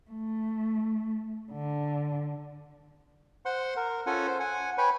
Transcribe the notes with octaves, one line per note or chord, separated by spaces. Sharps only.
A3
D3
C5 F#5 C6
A#4
C#4 F4 A4 F#5 G#5
C5
F#5 G#5
B4 C#5 G5 G#5 B5